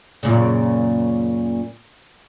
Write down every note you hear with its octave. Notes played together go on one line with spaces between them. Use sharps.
F#2 A#2 C#3